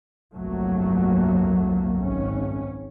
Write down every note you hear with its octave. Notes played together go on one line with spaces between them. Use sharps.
G1 C2 F2 F#3 A3 A#3
G#1 C#4